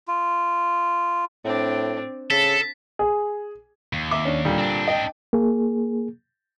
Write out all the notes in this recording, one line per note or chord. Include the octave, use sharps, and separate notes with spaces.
F4
A2 C4 D4
C#3 A4 A5 B6
G#4
D#2
E5 D6
C#4 D4
A#2 D3 G3
C4 D4
D#5 G5
A#3 G#4